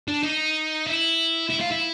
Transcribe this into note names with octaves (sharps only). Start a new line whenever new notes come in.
D4
D#4
E4
E4
F4
E4